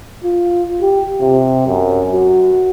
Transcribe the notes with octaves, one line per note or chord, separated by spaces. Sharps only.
F4
G4
C3
F#2
F#4